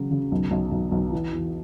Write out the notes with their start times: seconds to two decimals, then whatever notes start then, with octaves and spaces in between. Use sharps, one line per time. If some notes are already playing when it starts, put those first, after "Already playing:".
Already playing: C#3 F#3
0.11 C#3
0.32 B1
0.51 B1
0.72 B1
0.91 B1
1.12 E3
1.33 E2